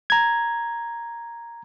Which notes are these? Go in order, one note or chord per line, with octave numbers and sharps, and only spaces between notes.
A#5 G#6